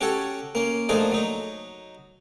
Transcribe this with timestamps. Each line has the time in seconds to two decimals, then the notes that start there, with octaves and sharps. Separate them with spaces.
0.01 C#4 F#4 G4 A4 C#5
0.55 A#3 C#4
0.89 A#2 F3 A3 D4 D#4 G#4
1.12 F#3 D#4